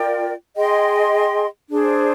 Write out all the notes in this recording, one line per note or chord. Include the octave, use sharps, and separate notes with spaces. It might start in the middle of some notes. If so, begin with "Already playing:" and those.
Already playing: F4 A#4 D5 G5
G#4 D#5 G5 C6
D4 G#4 C5